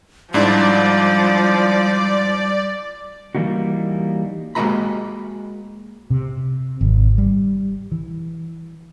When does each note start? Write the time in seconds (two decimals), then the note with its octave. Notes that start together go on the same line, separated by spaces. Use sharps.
0.34 G#2 F3 G3 D4 E4 D5
3.35 E3 G3 A#3 D#4 F#4
4.55 G#3 A#3 F#4 D#5 A#5 B5
6.11 C3
6.81 G#1
7.18 G3
7.92 E3